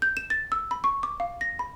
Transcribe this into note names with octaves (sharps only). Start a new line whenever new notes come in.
G6
E7
A6
E6
B5
C#6
D6
F5
A#6
B5